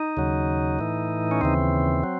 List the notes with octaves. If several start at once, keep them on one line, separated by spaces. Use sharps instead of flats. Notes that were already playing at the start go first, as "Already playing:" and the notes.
Already playing: D#4
D#2 C#3 F#3
A2 E3
C#4
D#2 C#3 E3 C4
F#3